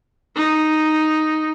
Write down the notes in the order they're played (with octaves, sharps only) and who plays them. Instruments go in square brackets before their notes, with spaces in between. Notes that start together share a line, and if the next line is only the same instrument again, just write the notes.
[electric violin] D#4